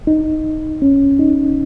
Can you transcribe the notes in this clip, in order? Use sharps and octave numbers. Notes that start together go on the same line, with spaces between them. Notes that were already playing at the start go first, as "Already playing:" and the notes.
D#4
C#4
D#4